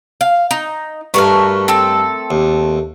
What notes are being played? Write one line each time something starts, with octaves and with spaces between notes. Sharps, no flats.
F5
D#4
G2 A3 F#4 A#4 B4 F6
C4 A4 E6
D#2